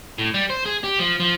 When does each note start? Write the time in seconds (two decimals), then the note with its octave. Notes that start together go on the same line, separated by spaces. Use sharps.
0.18 A2
0.34 G3
0.50 C5
0.66 G#4
0.84 G4
0.99 F3
1.20 F3